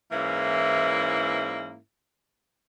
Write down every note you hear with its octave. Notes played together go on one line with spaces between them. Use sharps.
G#2 E3 A#3 C#4 E4